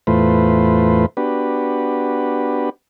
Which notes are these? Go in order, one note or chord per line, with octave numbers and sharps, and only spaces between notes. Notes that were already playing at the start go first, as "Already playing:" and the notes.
E2 A2 A3 F4 B4 C5
B3 D4 F#4 G4 B4